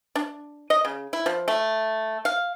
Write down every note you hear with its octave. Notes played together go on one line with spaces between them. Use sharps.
D4
D#5
C#3
E4
F3
A3
F5